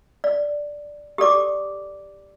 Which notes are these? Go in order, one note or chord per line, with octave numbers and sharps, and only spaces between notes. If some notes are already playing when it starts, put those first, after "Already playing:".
D5
G4 A4 D5 D6